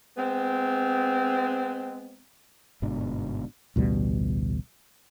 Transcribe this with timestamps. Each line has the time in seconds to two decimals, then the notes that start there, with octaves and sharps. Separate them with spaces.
0.17 G#3 B3 C4
2.82 G1 G#2 B2 D4
3.76 A1 D2 B2 G3